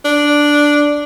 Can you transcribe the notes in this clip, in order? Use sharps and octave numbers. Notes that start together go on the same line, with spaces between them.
D4